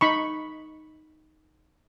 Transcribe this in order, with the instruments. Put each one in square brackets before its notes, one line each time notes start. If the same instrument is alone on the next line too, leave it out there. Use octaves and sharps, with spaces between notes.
[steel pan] D#4 B5 C#6